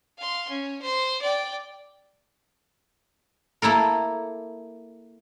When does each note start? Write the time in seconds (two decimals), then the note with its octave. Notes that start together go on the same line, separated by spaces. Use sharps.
0.18 F5 C6
0.49 C#4
0.82 C5 C6
1.21 D5 G5
3.62 A#3 E4 A4 A#4